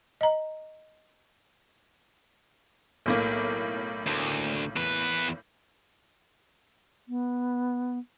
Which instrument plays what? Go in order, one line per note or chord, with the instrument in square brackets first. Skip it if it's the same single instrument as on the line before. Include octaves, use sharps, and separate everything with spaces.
[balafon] D#5 A#5
[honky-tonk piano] B1 A2 A#3
[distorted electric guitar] D2
E2 B4
[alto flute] B3